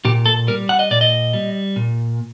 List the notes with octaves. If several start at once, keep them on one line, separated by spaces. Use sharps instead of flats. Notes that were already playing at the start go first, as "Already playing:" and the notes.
A#2 G4
A4
G3 A#4
F#5
D#5
A#2 D5
D#5
G3
A#2